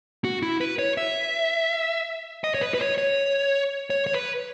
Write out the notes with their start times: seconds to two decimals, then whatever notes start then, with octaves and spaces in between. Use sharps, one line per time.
0.24 F#4
0.43 E4
0.61 B4
0.79 C#5
0.97 E5
2.44 D#5
2.54 C#5
2.61 B4
2.74 B4
2.80 C#5
2.98 C#5
3.90 C#5
4.07 C#5
4.14 B4